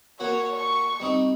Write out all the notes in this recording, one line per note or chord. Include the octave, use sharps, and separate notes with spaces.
A#3 F#4 C#5
C#6
G3 C4 D#4